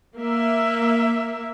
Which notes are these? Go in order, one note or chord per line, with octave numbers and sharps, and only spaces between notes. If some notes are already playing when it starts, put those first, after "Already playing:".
A#3 E5